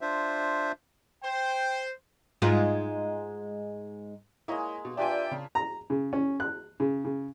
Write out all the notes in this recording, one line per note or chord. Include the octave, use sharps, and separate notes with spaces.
D4 F4 C5 E5
C5 G5
G#2 G#3 F4
G#3 A#3 E4 C#5 D#5
B2
D4 F4 G4 B4 D5 E5 G5 G#5
C#3
A#5
C#3
C#4
F#6
C#3
C#3